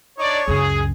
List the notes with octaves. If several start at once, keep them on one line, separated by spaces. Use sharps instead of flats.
D4 D#4 C#5 D5
C#2 F#2 G#4